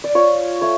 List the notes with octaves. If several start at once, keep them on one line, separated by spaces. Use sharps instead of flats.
D5
F4 C#5
A3 C#5